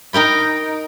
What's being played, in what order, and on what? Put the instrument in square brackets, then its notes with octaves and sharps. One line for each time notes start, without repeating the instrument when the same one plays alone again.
[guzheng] D#4 A#4 G5 B5